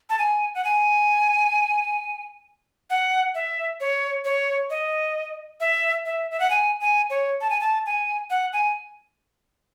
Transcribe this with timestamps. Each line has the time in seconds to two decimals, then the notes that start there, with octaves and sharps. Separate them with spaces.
0.10 A5
0.19 G#5
0.55 F#5
0.64 G#5
2.90 F#5
3.35 E5
3.80 C#5
4.25 C#5
4.70 D#5
5.60 E5
6.06 E5
6.31 E5
6.40 F#5
6.50 G#5
6.81 G#5
7.10 C#5
7.41 A5
7.50 G#5
7.61 A5
7.86 G#5
8.30 F#5
8.53 G#5